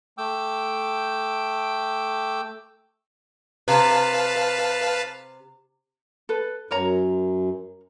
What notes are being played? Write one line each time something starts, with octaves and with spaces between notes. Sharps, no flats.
A3 G5 D6 E6
C3 B4 F5 A5
A4 B4
F#2 A#4 C#5 A#5